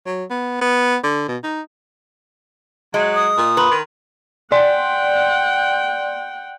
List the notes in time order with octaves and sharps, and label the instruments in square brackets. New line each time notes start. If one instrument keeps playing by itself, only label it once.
[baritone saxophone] F#3
B3
B3
D3
B2
D#4
[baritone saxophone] F#3 [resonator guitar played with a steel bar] G#3 [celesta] D#5
[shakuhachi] D#6
[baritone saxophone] A#2
[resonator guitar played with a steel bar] B4 [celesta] A#5 C6
[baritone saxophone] D#3
[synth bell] D5 C6 [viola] F#5 G5